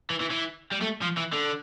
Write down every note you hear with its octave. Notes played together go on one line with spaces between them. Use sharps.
E3
E3
E3
G3
A3
F3
E3
D3